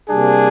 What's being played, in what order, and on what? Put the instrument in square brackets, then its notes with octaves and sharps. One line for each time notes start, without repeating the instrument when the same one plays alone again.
[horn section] C3 G3 A#3 D4 G#4